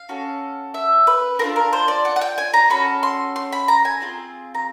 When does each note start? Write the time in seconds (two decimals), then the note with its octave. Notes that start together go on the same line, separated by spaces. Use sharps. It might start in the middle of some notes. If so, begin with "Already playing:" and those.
Already playing: F5
0.09 C#4 F#4 A4
0.74 E5
1.07 B4
1.39 D4 F4 A4 A#4
1.56 A#4
1.73 C5
1.88 D5
2.05 F#5
2.16 F#5
2.21 G5
2.38 G#5
2.54 A#5
2.70 C#4 F#4 A4 B5
3.03 C6
3.36 C6
3.52 B5
3.68 A#5
3.85 G#5
4.01 C4 F4 G#4
4.54 A#5